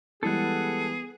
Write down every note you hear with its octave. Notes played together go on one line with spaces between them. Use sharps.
E3 G3 G#3 B3 G#4 A4 F#5